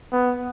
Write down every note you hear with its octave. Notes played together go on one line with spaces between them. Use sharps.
B3